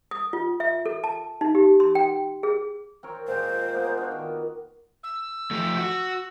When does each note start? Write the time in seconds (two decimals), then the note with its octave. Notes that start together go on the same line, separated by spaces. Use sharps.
0.11 D#6
0.33 F4
0.60 E5
0.86 A4
1.04 A5
1.41 D#4
1.55 G4
1.80 C6
1.95 G5
2.43 G#4
3.03 C4 A#4 C#5
3.27 A#2 G#3 G4 C5
3.74 G#3 A#3 B3
3.97 D4 F4 F#4
4.11 D#3
5.03 E6
5.51 F3 A3
5.77 F#4